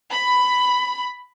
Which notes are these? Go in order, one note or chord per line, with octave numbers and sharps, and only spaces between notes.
B5